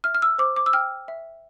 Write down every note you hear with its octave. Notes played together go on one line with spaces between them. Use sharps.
E5 F6
F6
E6
C5 D6
D6
E6
G5 F6
E5